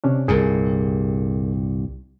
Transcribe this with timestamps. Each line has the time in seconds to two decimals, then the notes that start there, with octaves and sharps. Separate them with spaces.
0.04 C3 C#4 D4
0.28 C2 G2 A#2 G#4 A#4